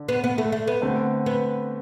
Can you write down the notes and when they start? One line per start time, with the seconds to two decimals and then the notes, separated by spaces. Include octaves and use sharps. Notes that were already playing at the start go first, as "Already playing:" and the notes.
Already playing: D3 D4
0.08 B3
0.24 B3
0.38 A3
0.52 A3
0.67 B3
0.82 D3 A3 C4
1.26 B3